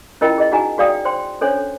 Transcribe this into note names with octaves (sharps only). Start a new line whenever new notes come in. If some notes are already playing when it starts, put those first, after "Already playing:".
C#4 E4 F4 A#4 D#5 G5
G#4 D#5
D#4 F#4 G#4 F#5 G#5 A#5
F#4 G#4 D5 F5 G5 D#6
C5 G5 C6
C#4 D4 A4 C5 C#5